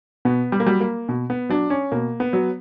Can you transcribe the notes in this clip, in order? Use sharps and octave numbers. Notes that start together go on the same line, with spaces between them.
B2 B3
G3
A#3
F#3 G3
A#3
B2
B3
F#3 D4
C#4
B2 A#3
B3
F#3